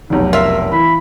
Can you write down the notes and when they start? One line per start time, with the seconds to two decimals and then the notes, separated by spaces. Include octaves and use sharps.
0.10 F1 B1 D#4
0.33 F4 A#4 E5
0.72 E3 B5